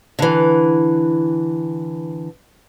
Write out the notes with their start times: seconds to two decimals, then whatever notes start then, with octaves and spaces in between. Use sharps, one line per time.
0.19 D3 E3